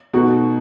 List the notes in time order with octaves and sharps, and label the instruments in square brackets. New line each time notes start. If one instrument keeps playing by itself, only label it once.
[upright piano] B2 A3 D#4 F#4